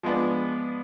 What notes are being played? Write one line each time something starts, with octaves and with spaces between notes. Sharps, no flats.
F3 G#3 B3 D4